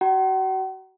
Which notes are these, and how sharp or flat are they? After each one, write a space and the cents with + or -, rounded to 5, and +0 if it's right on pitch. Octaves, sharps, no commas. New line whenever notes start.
F#4 +30 F#5 +45 A#5 +15